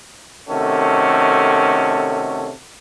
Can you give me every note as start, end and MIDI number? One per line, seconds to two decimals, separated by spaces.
0.49 2.51 48
0.49 2.51 51
0.49 2.51 57
0.49 2.51 61
0.49 2.51 66
0.49 2.51 69